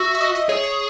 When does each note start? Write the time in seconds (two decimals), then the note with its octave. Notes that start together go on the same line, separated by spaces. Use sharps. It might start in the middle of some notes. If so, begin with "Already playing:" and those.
Already playing: F#4 E5
0.15 E5
0.21 D#5
0.35 D#5
0.49 G#4 C#5
0.63 C#5